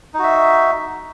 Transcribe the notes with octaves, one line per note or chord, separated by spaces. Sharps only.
D#4 F#4 E5